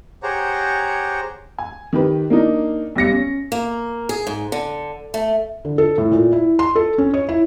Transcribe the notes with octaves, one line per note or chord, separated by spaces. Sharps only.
G4 G#4 C5 C#5 F#5 A#5
G#5
D#3 G4 B4
A#3 D4 D#4
B1 G3 A#6 C#7
C#4
A#3
G#4
G#2
D3
A3
D3
A4
A2
A#2
E4
C6
A4
C#4
C#5
E4